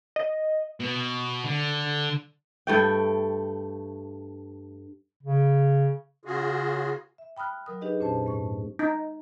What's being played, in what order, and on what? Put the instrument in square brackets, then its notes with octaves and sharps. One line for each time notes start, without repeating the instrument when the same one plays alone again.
[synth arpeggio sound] D#5
[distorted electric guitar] B2
D3
[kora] G2 A3 G5
[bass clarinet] C#3
[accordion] C#3 F4 F#4 G#4
[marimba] E5
G5 B5 D#6 F6 F#6
F#3 A#4 D#6
D4 D#4 G4 G#4 B4 D#5
F2 A#2 C#4 C5 A5
G#2 A3 C#6
[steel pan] D#4